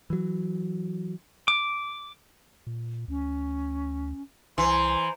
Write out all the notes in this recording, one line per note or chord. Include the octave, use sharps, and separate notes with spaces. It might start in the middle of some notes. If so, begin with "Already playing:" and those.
E3 F#3
D6
A#2
D2 C#4
C2 E3 C5 A#5 C6